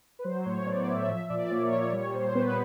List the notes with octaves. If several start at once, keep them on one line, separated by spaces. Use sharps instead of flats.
B4
F#3 C5
A2 C#5
B3 D5
A2 E5
F3 E5
A#2 D5
A#3 C#5
A#2 C#5
G3 C#5
A#2 C5
B3 B4